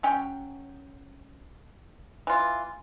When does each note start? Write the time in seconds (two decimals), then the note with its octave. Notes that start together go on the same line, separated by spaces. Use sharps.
0.03 F#3 C#4 G5
2.27 E3 F4